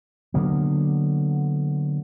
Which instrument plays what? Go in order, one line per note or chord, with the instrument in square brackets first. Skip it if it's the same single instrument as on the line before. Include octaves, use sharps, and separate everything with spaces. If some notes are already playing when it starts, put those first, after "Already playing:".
[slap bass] D3 F#3 A#3 B3